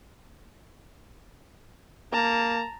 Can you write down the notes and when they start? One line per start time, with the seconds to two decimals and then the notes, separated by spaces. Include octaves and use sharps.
2.12 A#3 A5 A#5